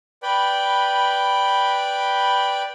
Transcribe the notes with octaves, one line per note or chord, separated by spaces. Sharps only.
B4 D5 G5 B5